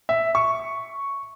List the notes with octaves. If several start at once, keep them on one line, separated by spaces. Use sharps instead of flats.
E5
C#6